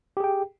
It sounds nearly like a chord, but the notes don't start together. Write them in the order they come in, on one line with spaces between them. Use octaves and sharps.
G4 G#4 G5